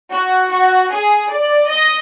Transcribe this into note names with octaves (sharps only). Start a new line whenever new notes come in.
F#4
F#4
G#4
D5
D#5